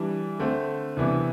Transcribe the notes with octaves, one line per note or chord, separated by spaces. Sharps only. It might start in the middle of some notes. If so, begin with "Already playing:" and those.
Already playing: E3 G3 D4
D3 A3 C4
C2 C3 E3 B3 D4